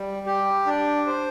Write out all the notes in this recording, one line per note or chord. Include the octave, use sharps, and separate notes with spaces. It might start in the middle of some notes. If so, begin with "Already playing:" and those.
Already playing: G3
G4
D4
C5